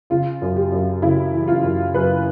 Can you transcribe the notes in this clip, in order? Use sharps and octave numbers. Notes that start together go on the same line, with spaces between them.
C#3 F4
F#2
G4
F#2
C#3 E4
E3
F4
F#2
F#2 B4